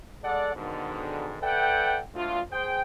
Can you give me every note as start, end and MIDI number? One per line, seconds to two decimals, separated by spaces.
0.23 0.53 56
0.23 0.53 69
0.23 0.53 74
0.23 0.53 78
0.55 1.37 44
0.55 1.37 47
0.55 1.37 50
0.55 1.37 51
1.42 2.00 69
1.42 2.00 71
1.42 2.00 74
1.42 2.00 76
1.42 2.00 78
1.42 2.00 79
2.14 2.40 38
2.14 2.40 65
2.51 2.81 68
2.51 2.81 72
2.51 2.81 79